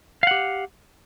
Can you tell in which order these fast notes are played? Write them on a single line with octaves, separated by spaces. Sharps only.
F5 F#5 G4